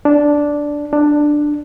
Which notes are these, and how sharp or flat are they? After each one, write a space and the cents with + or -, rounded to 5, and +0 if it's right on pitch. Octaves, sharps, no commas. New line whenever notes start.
D4 -5
D4 +10